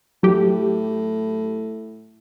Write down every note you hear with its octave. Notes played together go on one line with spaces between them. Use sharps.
A2 F#3 G4